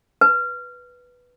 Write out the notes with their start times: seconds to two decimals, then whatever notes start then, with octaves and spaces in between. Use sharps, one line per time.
0.21 B4